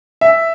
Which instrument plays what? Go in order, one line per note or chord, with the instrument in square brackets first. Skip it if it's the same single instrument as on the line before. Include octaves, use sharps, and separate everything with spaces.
[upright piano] E5